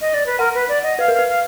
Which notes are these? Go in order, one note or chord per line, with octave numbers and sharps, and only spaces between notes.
D#5
D5
B4
A#4 F#5
B4
D5
D#5
B4 F5
A#4
F5
B4
F5